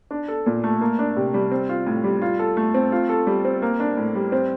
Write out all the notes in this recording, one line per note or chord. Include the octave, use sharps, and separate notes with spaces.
D4
A4
A#2
A3
A#3
D4
C3
G3
C4
F4
A2
G3
F4
A4
A3
C4
F4
A4
G3
C4
A#3
D4
A2
G3
C4